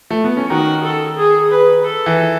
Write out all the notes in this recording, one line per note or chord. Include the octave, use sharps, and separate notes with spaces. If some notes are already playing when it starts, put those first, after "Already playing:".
A3
B3
C#4
D#3 D#4 F#4
A4
G#4
B4
A4
E3